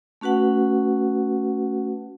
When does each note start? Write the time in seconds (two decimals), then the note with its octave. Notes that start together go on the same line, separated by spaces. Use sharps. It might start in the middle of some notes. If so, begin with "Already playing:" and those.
0.21 A3 C#4 F#4 B4 F#5